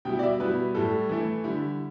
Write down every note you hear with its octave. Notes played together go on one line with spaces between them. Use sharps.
B2 G3 E4 G5
D5
E5
B2 G3 E4 B4
A2 G3 E4 A4
E3 A3 E4
D3 G3 E4